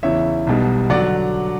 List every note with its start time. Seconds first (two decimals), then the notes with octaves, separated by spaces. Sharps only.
0.03 E2 C#3 E3 C#5 E5
0.47 B1 B2 G3
0.90 D3 F#3 D5 F#5